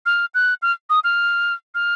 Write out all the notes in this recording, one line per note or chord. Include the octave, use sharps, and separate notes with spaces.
F6
F#6
F6
D#6
F6
F6